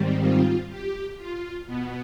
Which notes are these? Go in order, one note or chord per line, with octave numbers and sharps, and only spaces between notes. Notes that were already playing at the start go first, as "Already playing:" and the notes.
Already playing: G#2 D#3 G3 C4
F4
G4
F4
B2 B3